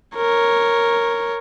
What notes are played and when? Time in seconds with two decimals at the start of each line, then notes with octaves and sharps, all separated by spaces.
0.16 A#4 C#5